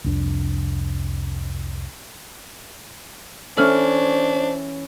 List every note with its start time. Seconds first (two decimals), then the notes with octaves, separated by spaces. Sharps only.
0.04 C2 F2 D4
3.57 E3 C#4 D4 A4 C5 F6